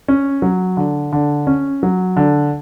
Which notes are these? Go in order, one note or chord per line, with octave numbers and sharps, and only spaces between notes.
C#4
F#3
D3
D3
C#4
F#3
D3